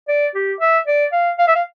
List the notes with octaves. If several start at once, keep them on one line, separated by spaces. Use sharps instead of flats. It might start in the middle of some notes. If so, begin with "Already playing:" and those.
D5
G4
E5
D5
F5
F5
E5
F5